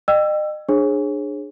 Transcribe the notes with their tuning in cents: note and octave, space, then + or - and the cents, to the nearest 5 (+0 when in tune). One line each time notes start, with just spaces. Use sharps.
D#5 -40 G5 +0 E6 +20
D4 +25 G#4 +0 C#5 -40